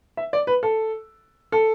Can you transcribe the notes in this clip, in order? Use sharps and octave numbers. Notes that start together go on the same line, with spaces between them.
E5
D5
B4
A4
A4